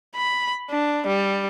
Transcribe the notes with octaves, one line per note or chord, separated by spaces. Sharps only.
B5
D4
G3